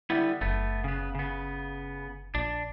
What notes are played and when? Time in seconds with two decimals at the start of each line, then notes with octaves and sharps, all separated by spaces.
0.10 D3 G3 B3 E4
0.41 F#1 A3 B3
0.84 C#3 B3
1.15 C#3 B3
2.35 A#1 D4